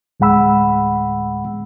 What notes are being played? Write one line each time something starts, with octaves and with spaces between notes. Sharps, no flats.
D2 A2 G#3 F#5 B5 E6